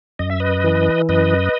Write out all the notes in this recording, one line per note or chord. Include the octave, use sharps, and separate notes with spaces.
F#2 D#5
E5
B4 D#5
E3
F#2 B4 D#5